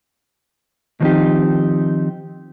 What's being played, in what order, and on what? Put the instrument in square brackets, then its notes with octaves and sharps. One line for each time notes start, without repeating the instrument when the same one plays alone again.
[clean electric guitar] D#3 F3 B3 C4 D#4 G4